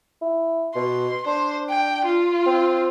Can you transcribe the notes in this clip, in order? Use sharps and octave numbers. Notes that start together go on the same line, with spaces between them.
E4
B2 C6
D4 C5
G5
F4
C4